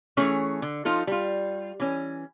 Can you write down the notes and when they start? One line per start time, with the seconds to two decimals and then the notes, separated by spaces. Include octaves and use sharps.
0.17 E3 A3 C#4 G#4 C#5
0.62 D3
0.85 F3 D#4 F4 A4
1.07 G3 F4
1.80 E3 C#4